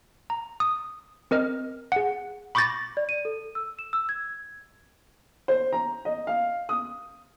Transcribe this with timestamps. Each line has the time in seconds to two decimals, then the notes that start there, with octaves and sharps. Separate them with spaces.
0.30 A#5
0.60 D#6
1.31 C4 A#4 D#5 F6
1.92 G#4 F#5
2.55 B5 C#6 D6 G6 A6 A#6
2.97 D5
3.09 D#7
3.25 A4
3.55 E6
3.79 E7
3.93 E6
4.09 G#6
5.48 C5
5.72 A#5
6.05 D#5
6.27 F5
6.69 D#6